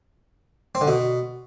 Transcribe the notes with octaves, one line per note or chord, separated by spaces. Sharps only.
C4
D3
B2